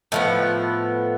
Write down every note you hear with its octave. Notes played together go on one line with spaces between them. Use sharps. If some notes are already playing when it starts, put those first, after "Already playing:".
A2 F3 B3